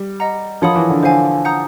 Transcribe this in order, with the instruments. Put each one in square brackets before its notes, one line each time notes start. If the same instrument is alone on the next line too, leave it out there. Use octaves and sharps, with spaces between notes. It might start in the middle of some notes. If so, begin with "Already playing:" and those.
Already playing: [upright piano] G3
[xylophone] D#5 F#5 A#5
[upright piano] F3 [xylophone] A#4 C#5 F#5 B5 D#6
[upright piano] E3
D3
[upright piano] D3 [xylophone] C5 F5 G#5
[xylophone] F#5 A#5 D#6 G6